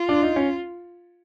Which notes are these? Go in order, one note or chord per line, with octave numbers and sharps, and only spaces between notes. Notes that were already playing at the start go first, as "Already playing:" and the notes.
Already playing: F4
D4
D#4
C#4